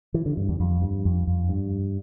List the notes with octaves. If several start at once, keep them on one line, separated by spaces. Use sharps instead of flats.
E3
D3
G2
E2
F2
G2
F2
F2
G2